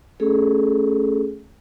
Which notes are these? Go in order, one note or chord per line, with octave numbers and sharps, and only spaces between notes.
A3 C#4 G#4 A4